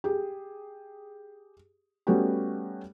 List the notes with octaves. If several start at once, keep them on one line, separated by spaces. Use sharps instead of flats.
G4 G#4
G3 A3 B3 C#4 F#4 G4